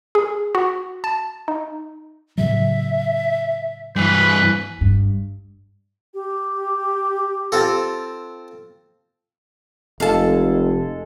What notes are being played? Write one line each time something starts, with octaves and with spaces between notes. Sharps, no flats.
G#4
F#4
A5
D#4
A2 C#3 F#3 E5
G2 E3 B4 G#5
G2
G4
C4 F4 A4
F1 G#3 G#4 A4 F5 A5